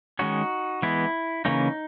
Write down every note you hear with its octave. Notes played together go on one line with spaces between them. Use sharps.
D#3 G#3 C#4 D#4 F#4
E3 G#3 B3 E4
C#3 E3 A#3 C#4 D#4